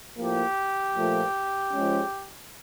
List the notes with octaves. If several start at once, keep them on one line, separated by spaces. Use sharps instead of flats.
A2 F3 A#3 G4
A#2 F3 A3
F3 G#3 C#4